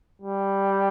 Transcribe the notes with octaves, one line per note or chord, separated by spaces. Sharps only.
G3